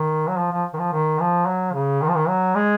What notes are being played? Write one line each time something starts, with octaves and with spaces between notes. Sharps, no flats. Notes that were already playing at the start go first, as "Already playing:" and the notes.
Already playing: D#3
F#3
F3
F3
D#3
F3
D#3
F3
F#3
C#3
D#3
F3
D#3
F#3
G#3